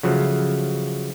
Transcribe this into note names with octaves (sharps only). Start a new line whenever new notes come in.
C#3 F3 F#3 A3